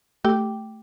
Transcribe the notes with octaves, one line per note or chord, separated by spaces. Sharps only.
A3 G4